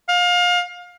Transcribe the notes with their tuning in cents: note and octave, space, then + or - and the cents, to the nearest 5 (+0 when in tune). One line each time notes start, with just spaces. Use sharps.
F5 +30